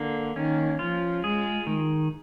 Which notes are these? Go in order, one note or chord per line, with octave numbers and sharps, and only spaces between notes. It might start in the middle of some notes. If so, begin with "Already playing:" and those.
Already playing: D3 A#3
D#3 C#4
F3 F4
G#3 G#4
D#3